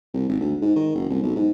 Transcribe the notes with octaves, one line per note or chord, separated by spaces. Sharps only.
C2
G#1
D2
G#2
D#3
F#1
C2
B1
G#2